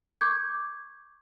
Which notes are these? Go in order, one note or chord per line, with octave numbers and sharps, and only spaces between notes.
C#6 D6 G6 G#6